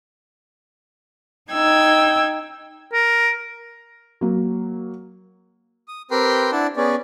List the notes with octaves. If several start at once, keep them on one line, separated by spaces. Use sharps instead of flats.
D#4 G5 E6 G#6
A#4
F#3 A#3
D#6
C4 G4 A#4 B4 G5 C6
D4 E4 D5 F#5 A5
B3 C#4 G#4 D5